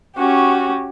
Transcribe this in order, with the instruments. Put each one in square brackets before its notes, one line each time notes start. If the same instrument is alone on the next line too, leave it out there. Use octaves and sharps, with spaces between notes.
[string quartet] C#4 F#4 G4